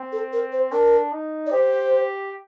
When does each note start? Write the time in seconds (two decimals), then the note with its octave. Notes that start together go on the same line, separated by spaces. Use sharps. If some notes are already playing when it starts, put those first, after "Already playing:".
Already playing: C4
0.12 A4
0.33 A#4
0.52 C5
0.72 D4 A#4
1.12 D#4
1.46 D5
1.52 G4 C5